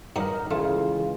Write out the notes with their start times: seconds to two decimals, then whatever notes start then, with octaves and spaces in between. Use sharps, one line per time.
0.16 G2 F#3 D#4 A#4 D#6
0.51 C#3 E3 G#3 A3 F4